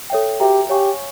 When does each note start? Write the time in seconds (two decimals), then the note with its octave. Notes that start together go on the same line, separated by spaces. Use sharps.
0.10 A4 C#5 E5 G5
0.40 F#4 G4 B4 E5 G5 A#5
0.69 G4 C#5 F5 G#5 C#6